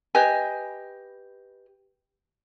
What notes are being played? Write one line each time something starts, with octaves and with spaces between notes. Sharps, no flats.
G4 B4 D#5 G#5